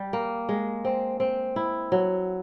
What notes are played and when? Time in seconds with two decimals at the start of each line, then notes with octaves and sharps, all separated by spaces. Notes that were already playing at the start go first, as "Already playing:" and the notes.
Already playing: G3
0.13 A#3
0.49 G#3
0.85 C4
1.20 C4
1.56 E4
1.92 F#3